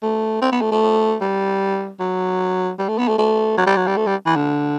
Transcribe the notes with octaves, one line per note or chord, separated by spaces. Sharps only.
A3
C4
B3
A3
A3
G3
F#3
G3
A3
B3
A3
A3
F#3
G3
F#3
G3
A3
G3
E3
D3